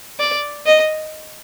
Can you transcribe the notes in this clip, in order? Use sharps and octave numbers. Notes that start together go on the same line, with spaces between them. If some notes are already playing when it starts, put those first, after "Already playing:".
D5
D#5